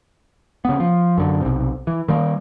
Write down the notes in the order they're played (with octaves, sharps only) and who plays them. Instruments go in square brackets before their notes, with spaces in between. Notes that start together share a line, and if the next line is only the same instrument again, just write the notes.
[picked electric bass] C#3 B3
F3
F#2 D3
B1 C3
E3
D#3 G3 A#3